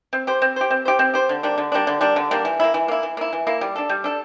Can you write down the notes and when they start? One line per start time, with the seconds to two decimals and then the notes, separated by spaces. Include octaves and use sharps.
0.13 C4
0.27 G4 C5
0.42 C4
0.56 G4 C5
0.71 C4
0.85 G4 C5
0.99 C4
1.14 G4 C5
1.29 D3
1.43 G3 A#3 D4
1.58 D3
1.72 G3 A#3 D4
1.87 D3
2.01 G3 A#3 D4
2.16 D3
2.31 G3 A#3 D4
2.45 E3
2.60 A#3 E4
2.74 E3
2.88 A#3 E4
3.03 E3
3.17 A#3 E4
3.33 E3
3.47 A#3 E4
3.61 G3
3.76 D4 A4
3.89 G3
4.04 D4 A4